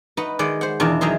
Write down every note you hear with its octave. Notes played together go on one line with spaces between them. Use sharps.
D#4 F#4 B4 F#5
D#3 G#3 D5 F#5
C5 F#5
E2 B2 D#3 D4 F4
D#3 F#3 D#4 G#4 E5 C6